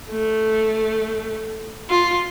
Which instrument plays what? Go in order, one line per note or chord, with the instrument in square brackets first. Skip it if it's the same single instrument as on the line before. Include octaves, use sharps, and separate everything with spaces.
[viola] A3
F4